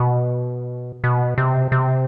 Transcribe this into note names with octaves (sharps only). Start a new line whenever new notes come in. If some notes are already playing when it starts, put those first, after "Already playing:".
Already playing: B2
B2
C3
C3